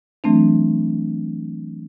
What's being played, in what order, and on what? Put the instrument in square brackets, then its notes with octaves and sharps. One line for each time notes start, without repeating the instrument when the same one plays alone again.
[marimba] E3 F#3 A3 C4 D4